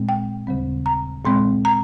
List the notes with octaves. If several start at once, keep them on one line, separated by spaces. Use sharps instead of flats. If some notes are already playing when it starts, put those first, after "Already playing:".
Already playing: A#2 G#3 C4
G5
D#2 C#3 G3 C4
A#5
A#2 G#3 C4 C6
A#5